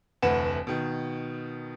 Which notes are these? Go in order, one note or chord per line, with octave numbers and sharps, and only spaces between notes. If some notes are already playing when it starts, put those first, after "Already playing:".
F1 D2 E3 B4 F#5 E7
B2 D#3